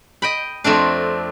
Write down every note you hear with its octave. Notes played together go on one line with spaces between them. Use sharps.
D#5 G5 B5
F2 A3 C4 D4